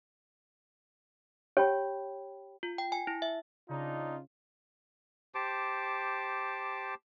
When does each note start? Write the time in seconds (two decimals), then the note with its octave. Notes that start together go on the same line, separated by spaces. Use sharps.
1.57 G4 C#5 G5 B5
2.63 F4
2.78 G5
2.92 G#5
3.07 E4
3.22 E5
3.69 C#3 D4 D#4 F4
5.35 G4 C5 A5 D6